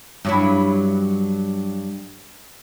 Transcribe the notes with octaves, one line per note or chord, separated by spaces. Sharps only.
G2 F#3 E4